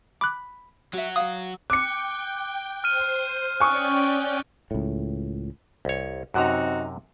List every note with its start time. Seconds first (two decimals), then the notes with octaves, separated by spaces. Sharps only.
0.21 B5 D6 F#6
0.93 F#3 F#4 E5
1.16 F5 F#5 D#6
1.70 G5 D6 F#6 C#7
2.84 C5 F6 D#7
3.60 C#4 D5 G5 G#5 C#6 D#6 F#6
4.71 C#2 A2
5.85 C2 C#5
6.34 F#2 C3 C4 D#4 F#4 A#5